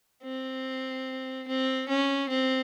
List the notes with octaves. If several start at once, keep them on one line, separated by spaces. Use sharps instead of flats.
C4
C4
C#4
C4